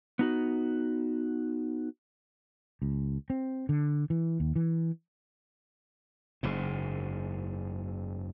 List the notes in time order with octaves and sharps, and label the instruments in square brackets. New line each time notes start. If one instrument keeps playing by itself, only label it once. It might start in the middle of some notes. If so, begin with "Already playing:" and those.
[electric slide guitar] B3 D#4 F#4
[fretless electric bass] C#2
C4
D3
E3
D#2
E3
[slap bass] F#1 G#2